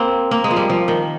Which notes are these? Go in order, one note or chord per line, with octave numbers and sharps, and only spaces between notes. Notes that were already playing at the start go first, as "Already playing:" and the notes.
Already playing: A#3 C4
A#3
G#3
F3
G3
F3
D#3